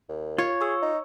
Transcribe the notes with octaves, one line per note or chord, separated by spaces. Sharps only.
D#2
F4 C#5 G#6
G#4 C#6 E6
D#4